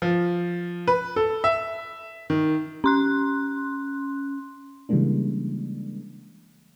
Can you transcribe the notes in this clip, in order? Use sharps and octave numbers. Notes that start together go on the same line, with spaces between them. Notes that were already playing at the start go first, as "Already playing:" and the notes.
F3
B4
A4
E5
D#3
C#4 C6 F#6
C#3 E3 G3 G#3 A#3 D4